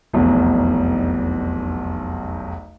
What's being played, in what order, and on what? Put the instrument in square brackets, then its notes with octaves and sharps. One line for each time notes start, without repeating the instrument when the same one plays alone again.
[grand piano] F1 B1 E2